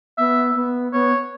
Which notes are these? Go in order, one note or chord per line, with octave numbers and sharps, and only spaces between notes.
B3 E5
B3
B3 C#5